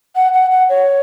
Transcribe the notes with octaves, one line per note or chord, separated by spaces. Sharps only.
F#5
F#5
F#5
C#5